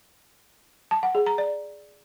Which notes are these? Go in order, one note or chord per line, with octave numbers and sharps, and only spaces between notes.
A5
F#5
G#4
A#5
D5